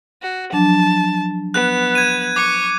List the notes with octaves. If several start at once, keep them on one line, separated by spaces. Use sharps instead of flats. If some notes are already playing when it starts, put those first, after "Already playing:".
F#4
F3 F#3 D4 A5
B3 F#6
G#6 D#7
C#6 D6